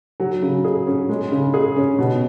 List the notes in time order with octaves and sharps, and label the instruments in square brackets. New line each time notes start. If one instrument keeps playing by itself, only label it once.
[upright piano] F#3
C#3
G#4
C#4
G#3
C#3
G#4
C#4
B2